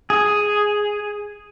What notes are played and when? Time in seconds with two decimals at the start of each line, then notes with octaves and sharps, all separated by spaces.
0.10 G#4